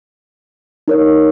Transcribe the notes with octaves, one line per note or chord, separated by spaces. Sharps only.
D#4 A#4 C#5